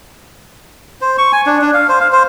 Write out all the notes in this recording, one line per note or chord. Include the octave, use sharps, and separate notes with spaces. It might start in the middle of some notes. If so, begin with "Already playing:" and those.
C5
C#6
G#5
D4
D4
F5
C5
F5
C5